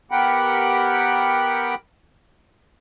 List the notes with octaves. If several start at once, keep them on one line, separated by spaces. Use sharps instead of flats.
B3 G4 A#4 F#5 G5 B5